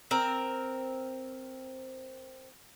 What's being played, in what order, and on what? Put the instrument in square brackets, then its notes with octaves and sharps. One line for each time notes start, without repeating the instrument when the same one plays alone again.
[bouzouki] C4 A#4